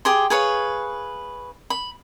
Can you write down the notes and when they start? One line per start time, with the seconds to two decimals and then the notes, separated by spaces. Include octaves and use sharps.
0.05 G4 G#4 C6
0.30 G#4 B4 C#5 F5
1.70 B5